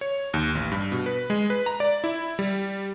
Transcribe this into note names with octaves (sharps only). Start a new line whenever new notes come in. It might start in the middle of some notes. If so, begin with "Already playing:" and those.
C#5
D#2
A1
G2
B2
B4
G#3
B4
A#5
D5
E4
G3